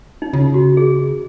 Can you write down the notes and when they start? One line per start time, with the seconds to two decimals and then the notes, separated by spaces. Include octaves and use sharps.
0.22 D#4
0.33 C#3 F4
0.54 F#4
0.77 G#4